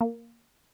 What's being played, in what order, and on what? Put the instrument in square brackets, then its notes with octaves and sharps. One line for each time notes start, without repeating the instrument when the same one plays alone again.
[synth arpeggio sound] A#3